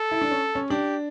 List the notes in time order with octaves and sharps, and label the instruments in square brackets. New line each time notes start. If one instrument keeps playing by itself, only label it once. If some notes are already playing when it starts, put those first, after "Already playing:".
Already playing: [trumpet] A4
[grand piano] E4
D4
C#4
C#4
[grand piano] D4 [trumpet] G4